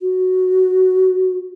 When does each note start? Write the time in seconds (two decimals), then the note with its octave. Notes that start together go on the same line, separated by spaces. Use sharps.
0.01 F#4